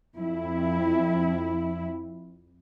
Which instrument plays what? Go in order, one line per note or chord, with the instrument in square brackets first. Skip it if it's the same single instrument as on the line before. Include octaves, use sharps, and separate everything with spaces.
[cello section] F2 E4